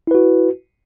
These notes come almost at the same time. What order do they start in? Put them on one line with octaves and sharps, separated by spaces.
E4 B4 F#4